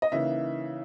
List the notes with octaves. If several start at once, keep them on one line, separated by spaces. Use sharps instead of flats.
D#5
C#3 E3 A#3 D#4 E5